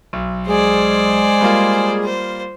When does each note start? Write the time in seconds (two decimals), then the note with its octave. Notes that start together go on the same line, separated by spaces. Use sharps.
0.13 B1
0.48 G#3 G#4 C5 D5
1.41 G3 A#3 F4
2.04 C5